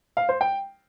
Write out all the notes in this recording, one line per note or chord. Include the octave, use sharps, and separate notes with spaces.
F5
C5
G5